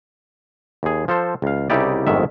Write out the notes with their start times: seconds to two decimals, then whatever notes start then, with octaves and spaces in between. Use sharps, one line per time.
0.83 D#2 G#4
1.08 F3 A4 C5
1.42 C#2 F5
1.70 C2 C#3 D#4 E4 G4 D5
2.07 G1 F2 G#2 D#3 E5